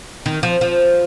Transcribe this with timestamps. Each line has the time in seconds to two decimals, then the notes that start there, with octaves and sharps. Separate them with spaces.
0.26 D#3
0.43 F3
0.61 F3